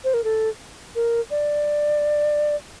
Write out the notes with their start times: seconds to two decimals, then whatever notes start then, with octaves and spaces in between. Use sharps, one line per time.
0.04 C5
0.14 A#4
0.24 A4
0.95 A#4
1.31 D5